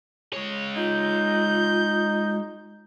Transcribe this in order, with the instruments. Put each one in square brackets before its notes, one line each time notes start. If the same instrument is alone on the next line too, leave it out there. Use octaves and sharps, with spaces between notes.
[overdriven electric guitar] G#3 C#5
[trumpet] D#4 [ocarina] F4 [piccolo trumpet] G6